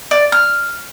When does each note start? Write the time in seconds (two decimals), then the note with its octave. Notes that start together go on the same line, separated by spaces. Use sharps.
0.11 D5
0.32 F6